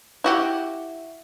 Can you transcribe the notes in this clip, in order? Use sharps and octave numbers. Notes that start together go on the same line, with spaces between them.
E4 F#4 G4